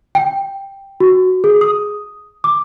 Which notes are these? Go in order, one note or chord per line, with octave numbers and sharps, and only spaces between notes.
G5
F#4
G#4
D#6
D6